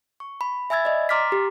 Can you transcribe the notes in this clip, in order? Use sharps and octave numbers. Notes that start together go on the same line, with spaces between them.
C#6
B5
E5 G#5 B5 E6 G#6 A6
D5 D#5
A#5 C6 D6 F6 A6 B6
G4